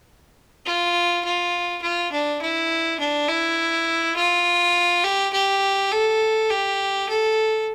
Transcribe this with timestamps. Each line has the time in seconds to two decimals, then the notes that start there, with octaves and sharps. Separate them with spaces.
0.65 F4
1.25 F4
1.82 F4
2.12 D4
2.42 E4
3.00 D4
3.28 E4
4.16 F4
5.04 G4
5.33 G4
5.92 A4
6.50 G4
7.09 A4